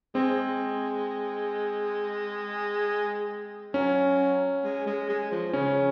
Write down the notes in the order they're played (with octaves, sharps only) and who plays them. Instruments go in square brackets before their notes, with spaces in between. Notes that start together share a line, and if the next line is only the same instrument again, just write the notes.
[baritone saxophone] G#3 [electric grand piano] C4
[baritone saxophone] F#3 [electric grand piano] C#4
[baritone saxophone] G#3
G#3
G#3
F3
[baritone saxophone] C#3 [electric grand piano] C#4